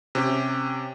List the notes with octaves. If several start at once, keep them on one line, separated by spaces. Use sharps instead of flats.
C3 C#4 G4